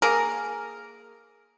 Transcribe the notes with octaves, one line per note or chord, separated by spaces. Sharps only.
A#3 G#4 A#4